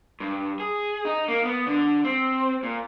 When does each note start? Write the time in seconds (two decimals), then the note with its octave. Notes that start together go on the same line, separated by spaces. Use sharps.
0.20 G2
0.60 G#4
1.05 D#4
1.28 A#3
1.45 B3
1.66 D3
2.04 C4
2.63 A#2